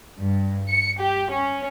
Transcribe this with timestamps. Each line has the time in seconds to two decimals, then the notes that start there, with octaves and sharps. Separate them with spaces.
0.21 G2
0.69 C#7
1.00 G4
1.31 C#4